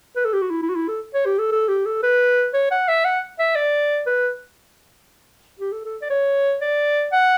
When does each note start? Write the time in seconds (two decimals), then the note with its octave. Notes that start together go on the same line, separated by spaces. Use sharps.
0.16 B4
0.25 A4
0.33 G4
0.42 F#4
0.50 E4
0.63 E4
0.69 F#4
0.76 E4
0.88 A4
1.14 C#5
1.26 G4
1.39 A4
1.52 A4
1.68 G4
1.86 A4
2.03 B4
2.54 C#5
2.71 F#5
2.88 E5
3.05 F#5
3.39 E5
3.55 D5
4.06 B4
5.60 G4
5.72 A4
5.85 A4
6.02 D5
6.10 C#5
6.61 D5
7.12 F#5